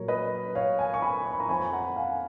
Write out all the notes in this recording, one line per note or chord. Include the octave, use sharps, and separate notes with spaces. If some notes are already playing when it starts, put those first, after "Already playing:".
Already playing: A#2 F#3 A#4 C#5
B4 D#5
C#5 F5
F5 G#5
C#6
G#5 B5
C#6
B5
A#5 C#6
F2 F3 G#5 B5
F#5 A#5
F5 G#5